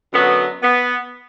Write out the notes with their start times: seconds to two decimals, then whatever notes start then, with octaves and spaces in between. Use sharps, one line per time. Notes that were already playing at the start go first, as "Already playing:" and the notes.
0.13 F#2 D3 F#3 B3
0.63 B3